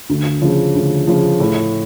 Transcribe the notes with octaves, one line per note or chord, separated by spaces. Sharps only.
D2
C#3 F3
D2
C#3 F3
A2